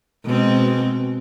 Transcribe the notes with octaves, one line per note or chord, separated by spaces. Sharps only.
B2 G#3 C4